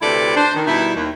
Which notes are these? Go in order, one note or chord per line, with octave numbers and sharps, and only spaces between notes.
D2 C3 E4 A4 B4 D5
D4 C5
D#3
B2 G3 D#4 E4
D#2